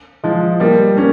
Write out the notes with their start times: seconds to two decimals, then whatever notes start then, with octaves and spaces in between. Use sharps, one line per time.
0.24 F3 G#3
0.60 G3 A#3
0.97 A#3 C#4